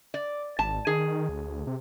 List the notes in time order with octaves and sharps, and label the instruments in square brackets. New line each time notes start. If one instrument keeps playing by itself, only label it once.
[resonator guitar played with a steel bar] D5
[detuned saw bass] G#1 [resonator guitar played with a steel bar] A5
[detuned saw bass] D#3 [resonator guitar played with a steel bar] G#4
[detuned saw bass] D2
C3